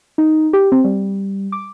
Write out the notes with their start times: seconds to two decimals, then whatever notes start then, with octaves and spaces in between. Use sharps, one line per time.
0.18 D#4
0.53 G4
0.72 C4
0.84 G3
1.52 D6